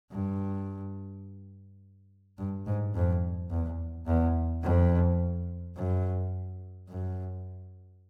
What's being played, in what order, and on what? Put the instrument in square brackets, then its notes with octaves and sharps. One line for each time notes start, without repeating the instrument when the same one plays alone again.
[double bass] G2
G2
G#2
F2
E2
E2
F2
F#2
F#2